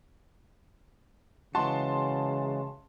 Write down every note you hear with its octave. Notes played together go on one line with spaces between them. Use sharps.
C#3 E3 G#3 F#4 A5 C6